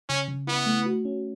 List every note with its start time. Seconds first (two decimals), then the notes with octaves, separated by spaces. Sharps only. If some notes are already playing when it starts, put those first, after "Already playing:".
0.09 C#3 C#4
0.28 C#3
0.47 B3 E4
0.66 A3
0.86 F#4
1.05 C#4